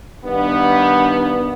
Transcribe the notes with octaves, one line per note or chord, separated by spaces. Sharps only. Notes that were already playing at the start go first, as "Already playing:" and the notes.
G2 D#3 B3